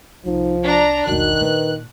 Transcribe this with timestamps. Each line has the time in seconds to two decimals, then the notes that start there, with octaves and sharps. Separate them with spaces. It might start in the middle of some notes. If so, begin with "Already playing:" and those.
0.25 C2 F3 D#4
0.65 D4 D5 A#5
1.07 E1 B1 D#3 F#4 F#6
1.41 A#2 B4